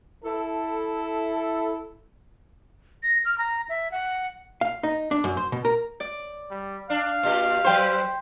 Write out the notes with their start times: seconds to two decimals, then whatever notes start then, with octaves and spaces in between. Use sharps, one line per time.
0.24 E4 A4
3.03 A#6
3.25 F6
3.38 A#5
3.69 E5
3.91 F#5
4.61 F5
4.83 D#4
5.11 D4
5.24 F#2
5.37 C5
5.52 B2
5.65 A#4
6.00 D5
6.51 G3
6.90 D4 F5
7.23 A#2 G4
7.64 F#3 B4 C5 G5 C6